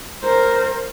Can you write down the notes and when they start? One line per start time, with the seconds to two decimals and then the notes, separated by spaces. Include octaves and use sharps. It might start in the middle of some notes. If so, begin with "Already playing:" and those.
0.22 A#4 C5